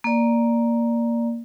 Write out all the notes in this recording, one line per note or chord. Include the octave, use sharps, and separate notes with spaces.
A#3 D5